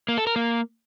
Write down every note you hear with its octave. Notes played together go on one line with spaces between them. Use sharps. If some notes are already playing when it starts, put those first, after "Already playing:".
A#3
A4
A#4
A#3